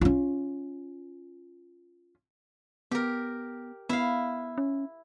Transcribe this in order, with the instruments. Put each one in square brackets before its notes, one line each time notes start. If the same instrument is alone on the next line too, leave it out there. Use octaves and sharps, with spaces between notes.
[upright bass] C#4 F4
[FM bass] B3 [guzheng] G4 A#4
[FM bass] B3 [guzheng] E4 F5
[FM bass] C#4